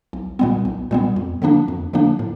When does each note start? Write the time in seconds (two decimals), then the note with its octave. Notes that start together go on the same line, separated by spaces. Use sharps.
0.13 B1
0.39 A#2 G3 B3
0.65 B1
0.91 A#2 G3 B3
1.16 F2
1.42 D3 F3 A#3 D4
1.68 F2
1.93 D3 F3 A#3 D4
2.19 A2